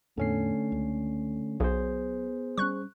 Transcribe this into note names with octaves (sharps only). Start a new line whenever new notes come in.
E2 A2 D3 A3 B3 C#4 C7
C#2
B1 F#3 B3 G#4 C5
G3 G#3 C#4 C#6 F#6